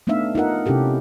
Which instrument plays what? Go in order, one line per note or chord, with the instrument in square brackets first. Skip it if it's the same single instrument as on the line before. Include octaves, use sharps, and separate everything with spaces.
[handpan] A3 B3 D4 D#4 E5 F5
D#4 F4 A#4 F#5
C3 C#4 E4 G4 A4